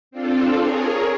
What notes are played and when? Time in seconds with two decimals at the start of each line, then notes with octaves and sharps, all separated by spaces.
0.11 C4 D4 F4 A4
0.58 G#4 A#4 C#5